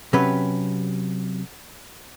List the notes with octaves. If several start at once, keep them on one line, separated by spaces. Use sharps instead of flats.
C3 F#3 C#4 G4 B4